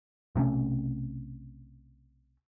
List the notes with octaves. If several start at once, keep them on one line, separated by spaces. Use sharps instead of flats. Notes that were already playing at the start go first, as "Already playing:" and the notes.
B1 C3 A3 C#4